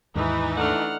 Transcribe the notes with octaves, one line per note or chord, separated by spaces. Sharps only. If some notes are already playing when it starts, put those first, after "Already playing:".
D#2 G#2 E3 D#4
A3 D4 F#5 F6